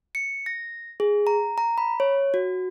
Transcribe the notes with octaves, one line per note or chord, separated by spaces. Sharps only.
C#7
A#6
G#4
A#5
A#5
B5
C#5
F#4